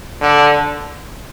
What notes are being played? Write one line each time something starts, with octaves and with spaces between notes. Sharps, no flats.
D3